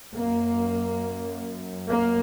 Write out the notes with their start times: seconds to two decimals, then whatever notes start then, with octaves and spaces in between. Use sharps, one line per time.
0.14 F#2 A#3
1.88 A#3